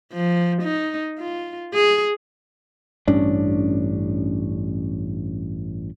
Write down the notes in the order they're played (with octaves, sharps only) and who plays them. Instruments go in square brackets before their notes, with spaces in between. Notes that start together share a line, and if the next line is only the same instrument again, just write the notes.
[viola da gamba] F3
D#4
F4
G#4
[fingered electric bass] A1 G2 C#4 D4